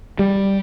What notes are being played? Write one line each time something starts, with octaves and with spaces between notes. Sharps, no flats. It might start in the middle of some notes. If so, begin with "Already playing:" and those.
G3